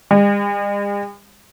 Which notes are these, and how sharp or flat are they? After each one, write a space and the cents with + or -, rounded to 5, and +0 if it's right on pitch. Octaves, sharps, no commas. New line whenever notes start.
G#3 -45